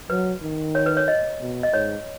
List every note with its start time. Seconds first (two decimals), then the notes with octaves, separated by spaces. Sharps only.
0.10 F#3 B4
0.43 D#3
0.75 C#5
0.86 B4
0.97 C#5
1.08 D#5
1.41 B2
1.63 D#5
1.73 G#2 C#5